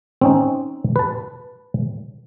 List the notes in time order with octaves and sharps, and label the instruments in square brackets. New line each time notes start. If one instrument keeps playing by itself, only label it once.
[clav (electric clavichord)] C4 C#4 D#4
B4 A5